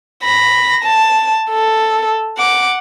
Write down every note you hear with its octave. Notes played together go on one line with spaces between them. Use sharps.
B5 A#6
A5
A4
F#5 D6